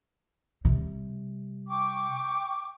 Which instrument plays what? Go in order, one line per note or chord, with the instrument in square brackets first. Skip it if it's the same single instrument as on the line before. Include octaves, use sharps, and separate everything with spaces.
[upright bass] C3 G3
[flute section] G5 C#6 D6